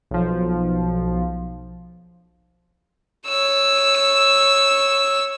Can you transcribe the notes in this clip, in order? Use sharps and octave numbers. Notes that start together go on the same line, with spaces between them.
B1 F3
C#5 E6